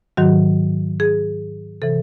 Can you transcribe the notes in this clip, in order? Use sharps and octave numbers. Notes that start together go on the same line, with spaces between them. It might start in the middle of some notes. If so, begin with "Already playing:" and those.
G#2 D#3 F#3 F#4
G#4
C3 E3 A4